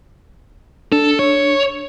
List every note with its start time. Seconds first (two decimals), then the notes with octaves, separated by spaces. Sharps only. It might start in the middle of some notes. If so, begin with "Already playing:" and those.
0.92 D4 A4
1.19 C#5